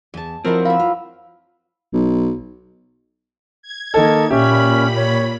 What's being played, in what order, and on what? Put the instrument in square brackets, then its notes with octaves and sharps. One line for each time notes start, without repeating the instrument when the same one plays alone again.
[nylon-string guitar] E2 [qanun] G#5 A5
[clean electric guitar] F3 C4 [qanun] F#3 E4 [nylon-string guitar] A#4 D#5
[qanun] B4 E5 [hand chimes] F5
[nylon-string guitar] F4
[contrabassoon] B1
[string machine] G#6
[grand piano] D#3 A#3 A4 [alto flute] D#5
[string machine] A#2 B5 [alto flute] C#4 [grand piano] G4 E5 G5
[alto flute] C#5